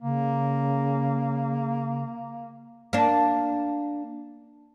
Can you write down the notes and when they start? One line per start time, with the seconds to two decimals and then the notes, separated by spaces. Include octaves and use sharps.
0.01 C#3 A#3
2.93 A#3 D4